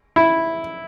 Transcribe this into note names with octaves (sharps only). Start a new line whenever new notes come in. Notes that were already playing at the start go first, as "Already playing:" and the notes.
E4